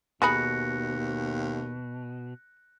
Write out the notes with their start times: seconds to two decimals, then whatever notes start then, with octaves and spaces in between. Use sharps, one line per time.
0.22 D#2 B2 D#4 G#4 B5 F#6 A#6 C#7